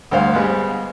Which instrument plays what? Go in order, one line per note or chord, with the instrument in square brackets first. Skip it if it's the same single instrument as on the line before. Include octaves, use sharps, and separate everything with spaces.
[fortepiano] D2 G2 C5 F5
G3 G#3 B3